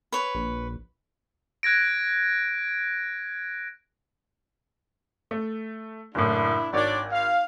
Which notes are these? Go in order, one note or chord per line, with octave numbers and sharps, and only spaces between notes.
B4 C#5
A#1
F#6 G#6 A#6 D7
A3
F#1 A2 D4 E4
G#1 D4 C#5 D5
F5